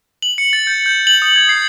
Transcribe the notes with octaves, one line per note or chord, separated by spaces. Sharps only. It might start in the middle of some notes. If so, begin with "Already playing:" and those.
F#7
C#7
A6
G6
G6
F#7
D#6
G#6
C7